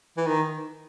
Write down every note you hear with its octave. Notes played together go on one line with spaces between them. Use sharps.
E3
D#3